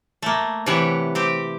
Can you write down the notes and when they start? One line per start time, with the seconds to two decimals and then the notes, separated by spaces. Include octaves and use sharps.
0.22 A3 A#3
0.66 C3 E3 G4 C#5 F#5
1.15 C4 G4